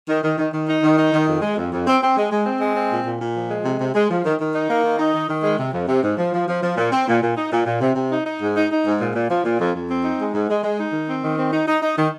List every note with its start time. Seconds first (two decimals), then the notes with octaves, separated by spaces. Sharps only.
0.08 D#3
0.23 D#3
0.38 D#3
0.53 D#3
0.67 D#4
0.83 D#3
0.98 D#4
1.13 D#3
1.28 F2
1.42 G#3
1.57 F2
1.72 F2
1.87 C4
2.02 C4
2.17 G#3
2.32 G#3
2.46 C4
2.60 G#3
2.75 C4
2.91 A#2
3.06 A#2
3.21 A#2
3.35 F3
3.50 G#3
3.64 C3
3.80 C3
3.95 G#3
4.10 F3
4.25 D#3
4.39 D#3
4.54 D#4
4.69 A#3
4.84 D#3
4.99 D#4
5.13 D#3
5.29 D#3
5.43 G#3
5.59 C3
5.73 F2
5.87 C3
6.03 G#2
6.18 F3
6.33 F3
6.48 F3
6.63 F3
6.77 A#2
6.92 C4
7.07 A#2
7.22 A#2
7.37 D#4
7.52 A#2
7.66 A#2
7.81 C3
7.95 C3
8.11 D#4
8.26 D#4
8.41 G#2
8.56 D#4
8.71 D#4
8.86 G#2
9.01 A#2
9.15 A#2
9.30 F3
9.44 A#2
9.60 F2
9.74 F2
9.89 C4
10.04 D#4
10.20 G#3
10.34 G#2
10.49 G#3
10.64 G#3
10.78 D#4
10.93 D#3
11.08 C4
11.23 D#3
11.37 C4
11.53 D#4
11.67 D#4
11.82 D#4
11.97 D#3